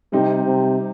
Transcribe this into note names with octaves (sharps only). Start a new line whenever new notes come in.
C3 G3 C4 D#4 G4
C3